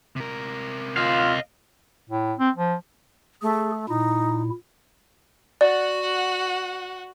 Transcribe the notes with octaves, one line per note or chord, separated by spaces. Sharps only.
C3 A#4
F4 D#5 F5
A2
C4
F3
A3 G#4
A#2 D#4 E4
F#4 D5 F#5